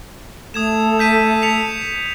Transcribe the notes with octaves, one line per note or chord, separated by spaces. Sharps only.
A3 A4 D#6 G#6 E7
G6 B6 D#7
B6 C#7 F7